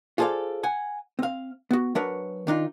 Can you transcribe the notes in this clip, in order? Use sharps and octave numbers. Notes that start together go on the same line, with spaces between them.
F4 G#4 A4 C5 D5 F5
F#5 G#5
C4 F5
B3 F#4
F#3 D4 A#4 B4 C#5
D#3 D4 D#4 F4